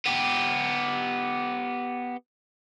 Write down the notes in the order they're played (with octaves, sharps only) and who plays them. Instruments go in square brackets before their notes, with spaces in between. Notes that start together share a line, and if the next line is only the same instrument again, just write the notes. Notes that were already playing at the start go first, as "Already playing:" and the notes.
[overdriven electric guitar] B3 G4